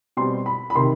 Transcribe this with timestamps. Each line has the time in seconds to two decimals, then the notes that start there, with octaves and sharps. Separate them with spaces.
0.17 B2 G3 C4 C6
0.46 B5
0.70 B5
0.75 C3 D#3 C6